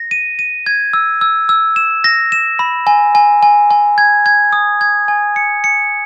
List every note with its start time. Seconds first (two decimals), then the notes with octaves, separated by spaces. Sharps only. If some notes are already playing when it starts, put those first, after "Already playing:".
Already playing: A#6
0.11 D#7
0.39 D#7
0.66 G#6
0.93 E6
1.21 E6
1.49 E6
1.76 E7
2.04 A#6
2.32 E7
2.59 B5
2.87 G#5
3.15 G#5
3.43 G#5
3.71 G#5
3.98 G#6
4.26 G#6
4.53 D#6
4.81 G#6
5.08 G#5
5.36 C#7
5.64 C#7